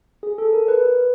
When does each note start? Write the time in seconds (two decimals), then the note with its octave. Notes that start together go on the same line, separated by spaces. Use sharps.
0.23 G#4
0.38 A4
0.53 A#4
0.68 B4